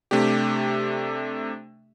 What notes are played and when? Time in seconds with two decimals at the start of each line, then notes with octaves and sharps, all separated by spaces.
0.11 C3 A3 D4 G4